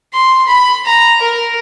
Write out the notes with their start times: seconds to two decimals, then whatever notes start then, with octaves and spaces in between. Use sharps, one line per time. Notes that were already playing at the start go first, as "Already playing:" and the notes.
0.13 C6
0.47 B5
0.85 A#5
1.21 A#4